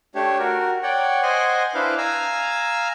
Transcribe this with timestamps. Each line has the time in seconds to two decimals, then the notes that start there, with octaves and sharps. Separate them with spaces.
0.15 A3 D4 G4 C#5
0.39 F#4 A#4
0.83 C#5 D5 F#5 G5
1.23 C5 D#5 F#5 G#5 C6
1.74 D4 E4 B4 C5 F5
1.98 F5 G#5 A#5 E6